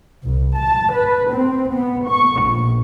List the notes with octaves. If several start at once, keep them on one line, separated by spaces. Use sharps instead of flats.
C2
A5
B4
C4
B3
C#6
A#1